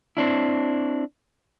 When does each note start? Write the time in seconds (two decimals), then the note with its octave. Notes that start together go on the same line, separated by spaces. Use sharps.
0.17 C4 D4 E4